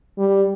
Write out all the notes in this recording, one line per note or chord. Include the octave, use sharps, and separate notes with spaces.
G3